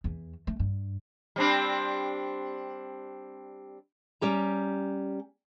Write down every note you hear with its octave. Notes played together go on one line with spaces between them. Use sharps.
E2
A3
G2
G3 C4 D4
G3 C#4 G4 A#5